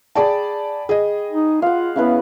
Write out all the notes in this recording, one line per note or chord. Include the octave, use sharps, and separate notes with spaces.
G#4 D5 G5 A5 B5
G#4 D#5
D#4
F4 F5 F#5
C#3 B3 E4 B4